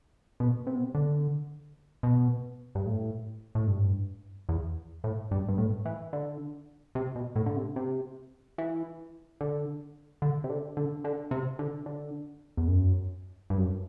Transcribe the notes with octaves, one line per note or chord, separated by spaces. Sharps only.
B2
C3
B2
C3
D3
B2
G2
A2
A2
G2
E2
A2
G2
G2
A2
E3
D3
C3
B2
A2
D3
C3
C3
E3
D3
D3
C3
D3
D3
D3
C3
D3
D3
E2
F#2
G2
F#2